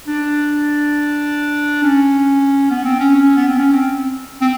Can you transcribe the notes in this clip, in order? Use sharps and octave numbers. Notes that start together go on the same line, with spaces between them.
D4
C#4
B3
C4
C#4
C#4
B3
C4
C#4
C4
C4